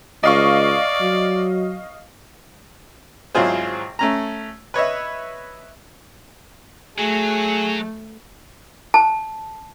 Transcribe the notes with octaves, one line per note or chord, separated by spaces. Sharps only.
C#2 D5 D#5 F5 C#6
F#3
G#1 F#3 E4 F4 G#4 C5
A3 C#4 A#5
B4 C#5 D#5 E5
F#3 A3 G#4
A5